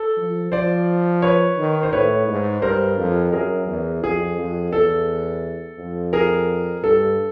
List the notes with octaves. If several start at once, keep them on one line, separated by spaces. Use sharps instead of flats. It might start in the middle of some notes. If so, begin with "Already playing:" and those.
Already playing: A4
F3
F3 C5 D5
B4 C#5
D#3
C5
A2 B4 C#5
G#2
G2 A#4 C5
F2
F#2 G#4 A#4
E2
F2 G#4
F2
E2 A4
F2
G#4 A#4
G2 A4